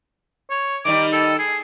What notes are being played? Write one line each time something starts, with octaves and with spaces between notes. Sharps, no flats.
C#5
D#3 G3 D#4 D6
A4
G#4